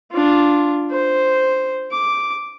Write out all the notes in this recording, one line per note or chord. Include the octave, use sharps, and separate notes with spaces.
D4 F4
C5
D6